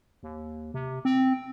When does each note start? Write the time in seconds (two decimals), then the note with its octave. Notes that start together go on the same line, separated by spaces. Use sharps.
0.23 D#2
0.74 C3
1.05 C4